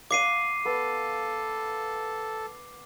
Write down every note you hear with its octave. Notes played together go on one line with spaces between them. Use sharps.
F5 F#5 D6 C7 D#7
B3 A4